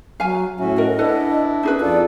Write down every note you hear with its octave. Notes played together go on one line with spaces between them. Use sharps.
F#3 F5 G#5
A2 C#4 F#4 E5
A#4 D#5
D4 E4 A4 B4 F#5
C#4 D#4 G#4 B4
F2 F4 A4 D5